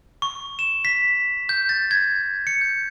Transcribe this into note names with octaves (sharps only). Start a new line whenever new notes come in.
C#6
E7
B6
G6
A6
G#6
C#7
G6